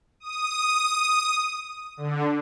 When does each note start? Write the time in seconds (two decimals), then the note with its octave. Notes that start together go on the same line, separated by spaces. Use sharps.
0.20 D#6
1.97 D3